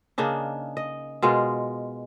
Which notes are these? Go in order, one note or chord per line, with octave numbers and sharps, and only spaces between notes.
C#3 A#3 D4 D#4
D#5
B2 G#3 F4 A#4